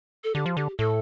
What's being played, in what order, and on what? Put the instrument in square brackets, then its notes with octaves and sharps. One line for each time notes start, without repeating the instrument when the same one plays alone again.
[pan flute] A4
[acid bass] D3 [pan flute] G4
[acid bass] F3
[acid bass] D3 [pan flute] G4
[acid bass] A2 [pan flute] A4